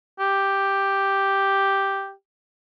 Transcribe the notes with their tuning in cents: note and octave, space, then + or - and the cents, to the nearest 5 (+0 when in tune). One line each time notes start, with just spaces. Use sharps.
G4 +0